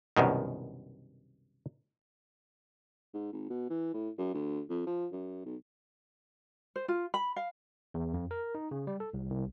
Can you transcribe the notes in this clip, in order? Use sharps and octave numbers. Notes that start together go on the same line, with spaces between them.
C2 F#2 B2 D#3
G#2
G#1
B2
E3
A2
F#2
D2
F2
F3
F#2
B1
C5
F4
B5
F5
E2
F2
A#4
D#4
C#3
G3
A4
C2
C2